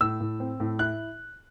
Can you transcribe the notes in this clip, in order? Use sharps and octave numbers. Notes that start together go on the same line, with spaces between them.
A2 E6
A2
C4
A2
E4 F#6